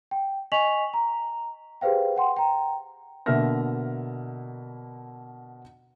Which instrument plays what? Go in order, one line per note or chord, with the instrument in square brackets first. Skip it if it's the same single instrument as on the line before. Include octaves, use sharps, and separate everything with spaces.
[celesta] G5
D#5 G#5 C#6 B6 F7 F#7
A#5
G4 G#4 B4 C5 F5 G5
F#5 G5 C6
G5 A#5
[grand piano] B2 D3 A#3 E5 F6 A#6